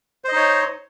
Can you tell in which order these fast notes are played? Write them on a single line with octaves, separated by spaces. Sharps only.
C5 D#5 D#4 C#5